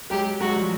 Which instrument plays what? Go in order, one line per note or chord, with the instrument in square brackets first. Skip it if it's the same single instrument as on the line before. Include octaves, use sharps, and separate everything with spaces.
[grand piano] F#3 G#3 [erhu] G4
[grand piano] F#3 G#3 [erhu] F#4
[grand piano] F3 G3